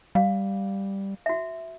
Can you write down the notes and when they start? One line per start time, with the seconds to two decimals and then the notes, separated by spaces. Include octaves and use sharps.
0.15 G3 F5
1.26 F#4 E5